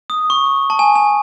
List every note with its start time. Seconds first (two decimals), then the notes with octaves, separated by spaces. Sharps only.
0.10 D#6
0.30 C#6
0.70 A5
0.79 G#5
0.96 G#5